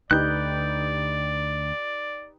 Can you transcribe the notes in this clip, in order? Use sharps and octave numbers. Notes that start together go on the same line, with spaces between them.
D2 D3 D#4 G4 B4 D5 F#6 G6